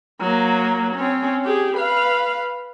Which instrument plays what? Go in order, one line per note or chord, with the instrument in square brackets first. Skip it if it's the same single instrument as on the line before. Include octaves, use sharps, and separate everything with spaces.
[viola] F#3 A#3
C4 C#4
G4 G#4
B4 F5